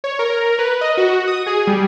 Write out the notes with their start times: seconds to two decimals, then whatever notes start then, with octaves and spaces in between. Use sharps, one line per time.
0.04 C#5
0.19 A#4
0.59 B4
0.81 D#5
0.97 F#4
1.27 D#6
1.46 G#4
1.67 G3